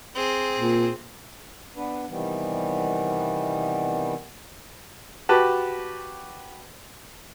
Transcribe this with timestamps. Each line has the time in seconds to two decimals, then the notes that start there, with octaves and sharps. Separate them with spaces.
0.15 C4 G#4
0.59 A#2
1.76 B3 D4 B4
2.08 C3 D#3 E3 G3 B3
5.29 F#4 G4 B4 A5